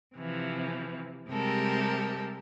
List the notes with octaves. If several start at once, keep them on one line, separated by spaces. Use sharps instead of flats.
C3 E3 F3
C3 G3 G#3 G4 A4 A#4